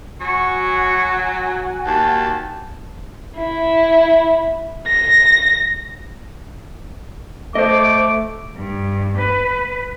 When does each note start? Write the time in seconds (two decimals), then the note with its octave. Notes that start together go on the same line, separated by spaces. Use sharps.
0.21 F#3 F#4 G#5 C#6
1.86 D#2 G5 A5
3.38 E4
4.87 A#6
7.55 A3 C5 D#5 D6
8.55 G2
9.17 B4